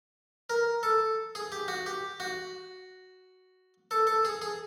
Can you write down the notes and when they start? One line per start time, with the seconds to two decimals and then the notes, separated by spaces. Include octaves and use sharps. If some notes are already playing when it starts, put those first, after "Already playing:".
0.50 A#4
0.83 A4
1.35 G#4
1.52 G4
1.68 F#4
1.86 G4
2.20 F#4
3.91 A4
4.07 A4
4.25 G#4
4.42 G#4